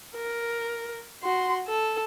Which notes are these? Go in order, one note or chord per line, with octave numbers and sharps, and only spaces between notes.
A#4
F#4 C6
A4